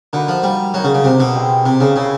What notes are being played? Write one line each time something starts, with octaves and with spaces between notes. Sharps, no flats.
D3 A#3 D#4 F#4 B4
F3
G3
F#3 A#3 D#4 F#4
C#3
C#3
C3
B2
G#3 C4 E4 G4
C3
C#3
C#3 E4 G#4 C5